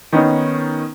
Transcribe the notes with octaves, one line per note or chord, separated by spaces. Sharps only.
D#3 B3 C#4 D#4